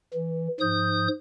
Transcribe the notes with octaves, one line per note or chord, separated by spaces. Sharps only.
E3
G#2 F3 D#6 G6